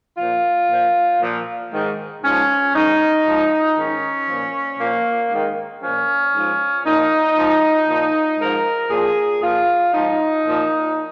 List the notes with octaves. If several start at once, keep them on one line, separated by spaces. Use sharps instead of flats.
A#2 F3 F4
A#2 F3
A#2 F3
G#2 D#3
G#2 F3 C#4
G#2 D#3 D#4
G#2 F3
G#2 D#3 C#4
A#2 F3
A#2 F3 A#3
G#2 D#3
A#2 F3 C#4
G#2 F3
A#2 F3 D#4
G#2 F3
A#2 F3
G#2 F3 A#4
A#2 F3 G#4
A#2 F3 F4
G#2 F3 D#4
A#2 F3